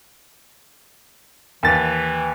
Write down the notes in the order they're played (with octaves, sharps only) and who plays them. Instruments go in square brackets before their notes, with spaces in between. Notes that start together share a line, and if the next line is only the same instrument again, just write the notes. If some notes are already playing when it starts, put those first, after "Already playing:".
[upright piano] D#2 A6 [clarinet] E3